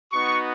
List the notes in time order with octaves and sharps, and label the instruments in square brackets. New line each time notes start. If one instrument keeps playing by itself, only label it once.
[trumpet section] B3 D#4 F#4 C#6